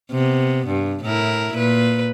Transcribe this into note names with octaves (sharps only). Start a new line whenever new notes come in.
C3 B3
G2
A2 E4 A#4
A#2 B4